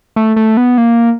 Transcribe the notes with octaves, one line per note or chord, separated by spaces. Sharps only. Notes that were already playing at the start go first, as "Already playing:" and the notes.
A3
A3
B3
A#3